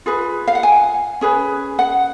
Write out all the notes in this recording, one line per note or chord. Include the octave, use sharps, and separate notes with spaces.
F4 G#4 B4
F5
F#5
G#5
C#4 G#4 B4
F#5